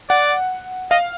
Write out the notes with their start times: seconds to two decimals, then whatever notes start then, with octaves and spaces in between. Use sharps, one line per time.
0.09 D5 F#5
0.91 D#5 F5